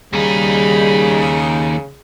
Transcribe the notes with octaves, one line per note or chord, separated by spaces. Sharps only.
D#2 C#3 G3 D#4 G#4 B5